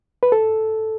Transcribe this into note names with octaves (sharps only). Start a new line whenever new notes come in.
B4
A4